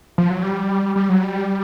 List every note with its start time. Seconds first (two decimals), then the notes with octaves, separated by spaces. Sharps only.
0.18 F3
0.30 F#3
0.43 G3
0.96 G3
1.09 F#3
1.23 G3